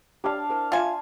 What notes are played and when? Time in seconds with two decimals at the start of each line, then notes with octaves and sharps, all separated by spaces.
0.24 D4 G4 C#5 F5 B5
0.49 E4 A#4 C5
0.72 F4 E5 G#5 A5